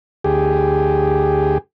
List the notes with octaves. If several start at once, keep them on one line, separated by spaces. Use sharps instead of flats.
D2 G4 G#4